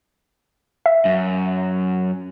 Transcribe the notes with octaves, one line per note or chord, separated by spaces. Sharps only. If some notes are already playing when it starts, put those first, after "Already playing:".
E5
F#2